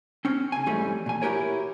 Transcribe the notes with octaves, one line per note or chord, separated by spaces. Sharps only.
C4 C#4
C#3 G#5
F2 G#2 E3 G3 A3 C#4
A#2 G#5
E4 F#4 G4 A#4 C#5